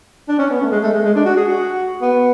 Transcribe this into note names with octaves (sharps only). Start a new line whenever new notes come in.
D4
C#4
B3
A3
G#3
A3
G#3
G#3
D4
F#4
G#4
F#4
B3